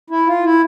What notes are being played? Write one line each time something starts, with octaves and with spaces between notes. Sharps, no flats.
E4
F4
E4